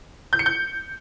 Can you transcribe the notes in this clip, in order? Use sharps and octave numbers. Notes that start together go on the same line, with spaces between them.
G6
C#7
G6